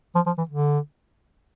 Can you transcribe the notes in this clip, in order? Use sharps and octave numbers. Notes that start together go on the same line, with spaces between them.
F3
F3
E3
D3